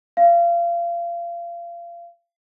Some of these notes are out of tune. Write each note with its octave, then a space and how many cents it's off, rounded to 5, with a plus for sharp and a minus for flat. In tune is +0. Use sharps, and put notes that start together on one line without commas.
F5 -30